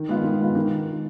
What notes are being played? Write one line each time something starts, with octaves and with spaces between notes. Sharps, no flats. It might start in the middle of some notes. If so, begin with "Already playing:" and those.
Already playing: D#3
G#3 B3 F4
D#3
G#3 B3 F4
D#3